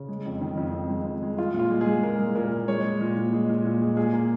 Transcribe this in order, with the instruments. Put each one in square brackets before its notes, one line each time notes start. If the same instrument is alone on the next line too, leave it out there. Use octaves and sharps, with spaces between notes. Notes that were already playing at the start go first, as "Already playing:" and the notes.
Already playing: [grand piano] C#3
G#3
F2
D#3
F2
F2
G#3
F2
G#3
G#3 F4
A#2
F4
G#3
G#4
G#3
A#2 A#4
G#3
A#2 A#4
A#2
G#3 C#5
G#3
A#2
A#2
G#3
A#2
A#2
G#3
A#2 G#4
A#3